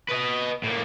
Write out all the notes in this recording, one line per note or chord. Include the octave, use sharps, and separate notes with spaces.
B4 D#5
A2 A#3